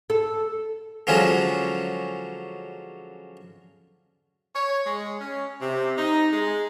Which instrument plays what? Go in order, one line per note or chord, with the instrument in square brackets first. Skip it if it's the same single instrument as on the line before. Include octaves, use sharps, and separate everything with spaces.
[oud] A4
[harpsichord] D3 F3 F#3 G#3 C#4
[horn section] C#5
G#3
C#4
C3
D#4
G#3